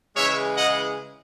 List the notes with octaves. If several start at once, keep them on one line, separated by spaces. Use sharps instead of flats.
C#3 E3 G#3 C#5 E5
D#5 F#5